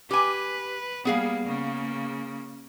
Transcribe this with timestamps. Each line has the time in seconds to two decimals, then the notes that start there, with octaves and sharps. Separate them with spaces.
0.11 G4 B4 G#5
1.05 G3 A#3 B3 G#4 F5
1.45 C#3 A#3